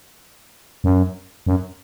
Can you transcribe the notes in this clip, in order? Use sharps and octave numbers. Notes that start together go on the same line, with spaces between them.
F#2
F#2